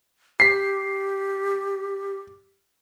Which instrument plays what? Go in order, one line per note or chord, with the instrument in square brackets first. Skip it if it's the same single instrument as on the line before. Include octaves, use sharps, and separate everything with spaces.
[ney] G4 [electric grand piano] B6 C7